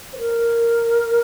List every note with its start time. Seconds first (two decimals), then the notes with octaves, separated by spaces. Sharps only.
0.13 C5
0.18 A#4